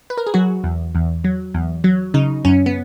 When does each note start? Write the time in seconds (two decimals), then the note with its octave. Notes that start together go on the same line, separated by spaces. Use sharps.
0.10 B4
0.17 A#4
0.27 G#4
0.34 F#3 F#4
0.64 E2
0.95 E2
1.24 F#3
1.54 E2
1.84 F#3
2.14 C#3 D#4
2.45 F#2 C#4
2.66 B3